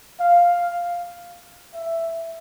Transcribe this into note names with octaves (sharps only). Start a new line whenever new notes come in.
F5
E5